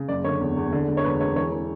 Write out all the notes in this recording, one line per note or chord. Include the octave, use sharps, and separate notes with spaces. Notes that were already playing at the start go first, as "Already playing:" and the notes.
Already playing: C#3
F#1 D5
D3 C#5
E2
E2
D3
D3
C#5
E1 B4
E1 C#5
E3 C#5
E3